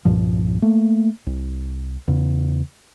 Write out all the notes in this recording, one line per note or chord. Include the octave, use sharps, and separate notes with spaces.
C2 G2 A#2 F3
A3 A#3
C2
E2 C#3